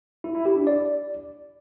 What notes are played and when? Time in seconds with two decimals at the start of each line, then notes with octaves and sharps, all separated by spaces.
0.24 E4
0.35 E4
0.46 G4
0.56 D4
0.67 D5